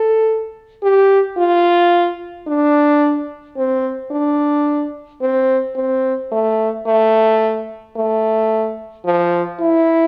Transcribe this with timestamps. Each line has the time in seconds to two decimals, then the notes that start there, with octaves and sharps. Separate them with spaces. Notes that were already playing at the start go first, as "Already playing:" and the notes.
Already playing: A4
0.83 G4
1.38 F4
2.48 D4
3.57 C4
4.11 D4
5.21 C4
5.76 C4
6.32 A3
6.86 A3
7.96 A3
9.05 F3
9.60 E4